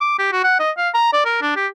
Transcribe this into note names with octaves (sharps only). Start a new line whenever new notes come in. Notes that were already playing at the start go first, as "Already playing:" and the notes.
D6
G4
F#4
F#5
D#5
F5
A#5
D5
A#4
D4
G4